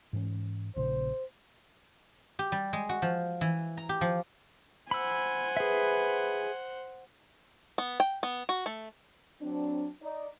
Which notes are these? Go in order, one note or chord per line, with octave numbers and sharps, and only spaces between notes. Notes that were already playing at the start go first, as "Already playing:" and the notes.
G#2 E3 C#4
A#1 A#2 C#3 C5
G4
G3
G#3
F#4
F3
E3
A#5
G4
F3
C5 F#5 G#5 B5 E6
G#4 B4 E5
B3
G5
B3
F#4
A3
F#3 C4 D4
D#4 D5